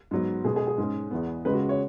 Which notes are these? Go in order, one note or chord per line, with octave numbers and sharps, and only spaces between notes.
G#2 F#3 B3
B2 G#3 B3 G#4
G#4
G#4
G#2 G#3 C#4
E2 E3 B3
C#2 C#3 G#3 C#4 B4
F#4
C#5